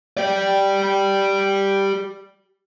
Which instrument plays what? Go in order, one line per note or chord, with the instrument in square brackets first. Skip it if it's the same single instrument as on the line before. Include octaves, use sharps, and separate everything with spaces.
[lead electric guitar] G4 D5